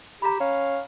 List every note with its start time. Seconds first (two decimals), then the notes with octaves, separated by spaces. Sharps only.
0.22 G4 A#5 B5
0.40 C#4 F5